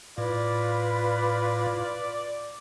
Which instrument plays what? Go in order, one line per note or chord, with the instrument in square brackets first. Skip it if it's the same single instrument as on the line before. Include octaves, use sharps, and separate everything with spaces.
[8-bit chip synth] A2 [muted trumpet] F4 [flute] B4 [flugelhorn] D5